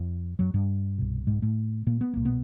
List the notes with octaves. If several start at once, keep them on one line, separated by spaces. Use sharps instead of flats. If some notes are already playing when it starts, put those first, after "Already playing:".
Already playing: F2 F3
F#2 F#3
G2 G3
C2 B2
G#2 G#3
A2 A3
A#2 A#3
B3
C2 A#2 A#3
B2 B3